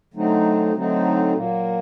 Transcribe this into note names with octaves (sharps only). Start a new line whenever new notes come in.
D3 F#3 A3 C4 D#4
D3 F#3 A3 C4 D#4
A#2 F#3 A#3